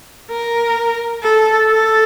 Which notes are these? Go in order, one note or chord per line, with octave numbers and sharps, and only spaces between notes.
A#4
A4
A4